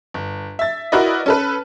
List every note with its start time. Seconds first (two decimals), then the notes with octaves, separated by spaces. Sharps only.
0.14 G1
0.59 E5 A6
0.92 E4 F#4 A#4 B4 D5 D#5
1.26 C#4 A4 B4